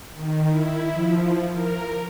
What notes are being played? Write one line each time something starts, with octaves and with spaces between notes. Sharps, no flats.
D#3
E4
F3
A#4